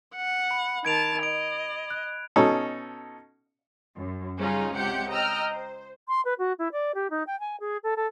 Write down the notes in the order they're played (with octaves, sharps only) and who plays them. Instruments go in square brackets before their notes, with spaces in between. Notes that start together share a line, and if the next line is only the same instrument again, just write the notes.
[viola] F#5
[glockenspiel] B5
[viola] D#3 A5 [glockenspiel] G#6 D7 F7
[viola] D#5 [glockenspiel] D7
[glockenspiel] F#6
[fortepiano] B2 C#4 D#4 A4
[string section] F#2
C#3 G3 C#4 D#4 F4
C#2 C3 G4 F#5 G6 C#7
D#5 G5 A#5 E6 F6
C5
[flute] C6
B4
F#4
E4
D5
G4
D#4
G5
G#5
G#4
A4
A4